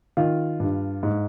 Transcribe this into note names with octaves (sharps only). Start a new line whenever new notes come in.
D#3 F4
G2
G#2